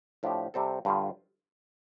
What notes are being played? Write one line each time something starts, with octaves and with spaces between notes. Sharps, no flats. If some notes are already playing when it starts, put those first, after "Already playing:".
A2 F3 D4 G4
C3 G3 C4 A4
G2 D3 G3 F4